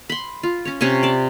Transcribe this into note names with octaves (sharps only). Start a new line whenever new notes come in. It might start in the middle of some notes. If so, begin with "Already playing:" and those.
B5 C6
F4
C#4 C#5
C3 C#4 G#5 C#6
D5 A5